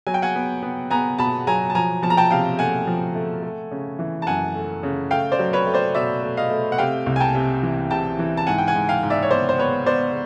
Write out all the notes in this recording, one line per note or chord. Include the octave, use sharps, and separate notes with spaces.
F#3 G#5
G5
F#5 G#5
B3
B3
B3 G#5 A#5
B2 A5 B5
F#3 G#5 A#5
A5
F3 G#5 A#5
F3 A5
A#5
G5 A5
C3 F5 G5
A3 F#5 G#5
F3
A3
A3
C#3
E3
A5
F#2 F#5 G#5
A3
C#3
A3 F5 G5
C5 D5
F#3
B4 C#5
A3
C5 D5
B2 D5 E5
A3
D#5 F5
A3
F#5
C3 F5 G5
C2
G#5
G5 A5
C3
E3
C3 G5 A5
E3
A5
G#2 F#5 G#5
G5
F#5 G#5
G#2
F5 G5
G#2
D5 E5
C#5
B3 C5 D5
C5
B3 B4 C#5
B3 C5 D5